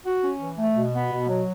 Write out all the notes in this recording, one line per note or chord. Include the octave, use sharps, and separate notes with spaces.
F#4
C#4
E3
A3
B2
B3
B2
F#3